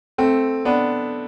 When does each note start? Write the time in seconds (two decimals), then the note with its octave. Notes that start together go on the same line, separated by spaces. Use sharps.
0.18 A3 C4
0.65 B3 D4